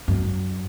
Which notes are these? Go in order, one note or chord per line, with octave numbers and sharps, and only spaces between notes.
F#2